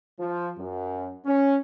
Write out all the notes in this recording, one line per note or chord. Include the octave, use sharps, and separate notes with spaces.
F3
F#2
C#4